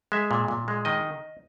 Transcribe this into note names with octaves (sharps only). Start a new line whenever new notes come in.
G#3 E5
A#2
A#2
G#3
D#3 D#5